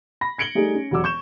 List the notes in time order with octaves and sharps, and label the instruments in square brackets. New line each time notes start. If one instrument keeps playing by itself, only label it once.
[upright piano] B5 A#6
G#6 C#7 D7 F#7 G7
G3 A3 D#4 G#4
C#4
E1 F#3 F#4 D5 D6 E6
C#6 G6 E7